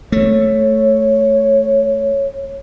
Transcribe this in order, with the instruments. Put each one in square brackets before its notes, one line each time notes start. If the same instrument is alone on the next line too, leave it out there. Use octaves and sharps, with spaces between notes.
[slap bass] A3 [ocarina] C#5